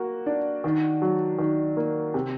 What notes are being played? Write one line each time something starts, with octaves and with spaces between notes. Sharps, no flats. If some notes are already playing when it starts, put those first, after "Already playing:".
Already playing: A#3 F#4
D4
D#3
F#3
D#3
A#3
C3